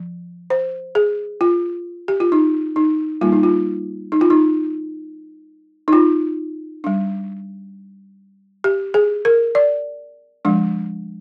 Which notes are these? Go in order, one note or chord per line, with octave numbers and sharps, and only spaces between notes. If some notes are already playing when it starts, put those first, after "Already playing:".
Already playing: F3
C5
G#4
F4
G4
F4
D#4
D#4
G3 A#3 D#4 F4
D#4
F4
D#4
F4
D#4
D#4
F4
G3 D4
G4
G#4
A#4
D5
F3 G#3 D4